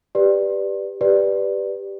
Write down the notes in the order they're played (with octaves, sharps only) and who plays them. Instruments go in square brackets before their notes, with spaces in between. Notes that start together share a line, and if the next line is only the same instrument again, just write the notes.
[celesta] G4 B4 D5
G4 B4 D5